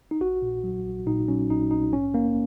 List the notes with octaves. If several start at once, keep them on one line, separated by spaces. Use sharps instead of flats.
D#4
A#1 F#4
A#2
F#3
A#1
A#2 D#4
F#3 C#4
A#1 D#4
A#1 D#4
G#2 C#4
G#1 A#3